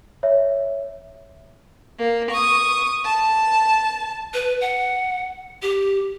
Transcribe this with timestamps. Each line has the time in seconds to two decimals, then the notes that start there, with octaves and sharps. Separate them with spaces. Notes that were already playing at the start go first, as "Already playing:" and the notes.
0.23 C#5 E5
1.99 A#3
2.31 C#6 D#6
3.05 A5
4.34 B4
4.61 F#5
5.62 G4